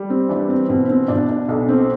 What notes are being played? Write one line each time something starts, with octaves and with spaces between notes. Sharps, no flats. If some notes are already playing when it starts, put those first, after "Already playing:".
Already playing: G3
C4
E3 D4
C4
B2 C4
C4
B2 D4
D4
B1 D4
C4